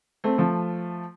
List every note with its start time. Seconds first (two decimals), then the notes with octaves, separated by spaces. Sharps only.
0.24 A3 C4
0.38 F3 A3